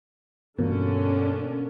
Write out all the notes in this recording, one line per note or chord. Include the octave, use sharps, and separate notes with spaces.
G2 B2 D3 E3 A#3 C#4